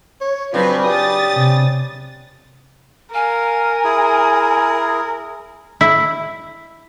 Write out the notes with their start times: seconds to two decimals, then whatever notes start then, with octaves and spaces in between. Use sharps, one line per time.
0.21 C#5
0.54 C#3 F#3 C4 D4 F4 B4
0.86 G4 D#6 A6
1.34 C3
3.14 A#4 F5 G#5
3.84 E4 G#4
5.81 E4